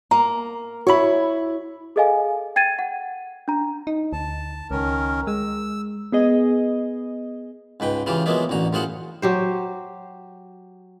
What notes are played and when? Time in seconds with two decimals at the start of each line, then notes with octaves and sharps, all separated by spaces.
0.11 A#3 A#5
0.87 E4 F#4 C#5 B5
1.96 G#4 A4 D#5 F5 G#5
2.56 G5 G#6 A6 D#7
2.79 F#5
3.48 D4 A#5
3.87 D#4
4.13 D2 A5
4.71 C#2 D#3 C#4 A#4
5.27 G#3 E6
6.12 B3 G#4 D#5
7.80 C#2 G#2 B4 G5
8.06 C#3 E3 F4 G4
8.26 F3 F#3 G#3 A#3 B3 E4
8.49 A1 D2 F#4 A#5
8.73 F#2 A2 F4 G#4 C5 F#5
9.22 F#3 G4 C5